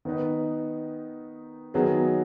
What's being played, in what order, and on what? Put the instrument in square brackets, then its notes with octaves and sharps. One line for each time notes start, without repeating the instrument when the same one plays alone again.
[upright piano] D#3 B3 D#4 B4
D#3 F#3 B3 G#4